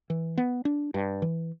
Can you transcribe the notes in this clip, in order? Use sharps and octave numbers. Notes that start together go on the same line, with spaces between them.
E3
B3
D4
G2
E3